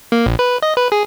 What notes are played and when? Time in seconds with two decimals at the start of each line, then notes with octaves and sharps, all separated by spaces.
0.12 A#3
0.26 A#1
0.39 B4
0.62 D#5
0.77 B4
0.92 G#4